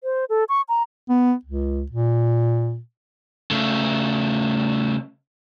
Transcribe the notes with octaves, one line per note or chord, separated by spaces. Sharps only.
C5
A4
C#6
A#5
B3
C#2
A#2
C#3 A3